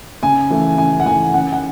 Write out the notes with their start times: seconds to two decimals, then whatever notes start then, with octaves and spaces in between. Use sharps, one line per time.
0.23 C#3 G#5
0.51 E3 A3
0.78 C#3 G#5
1.00 F#5
1.06 E3 A3 G#5
1.34 C#3 F#5
1.52 F#5